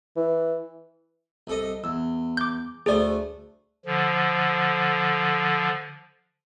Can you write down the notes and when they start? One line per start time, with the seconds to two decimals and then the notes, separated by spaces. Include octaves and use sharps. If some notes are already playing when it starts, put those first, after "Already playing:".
0.16 E3
1.47 C2 A4 D#5
1.84 E2 E6
2.37 D6 G6
2.86 D2 A3 G#4 C5 D5
3.86 D3 F3